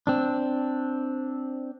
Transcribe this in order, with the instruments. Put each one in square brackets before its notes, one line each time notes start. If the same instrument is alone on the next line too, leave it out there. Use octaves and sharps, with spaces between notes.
[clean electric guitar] C4 D4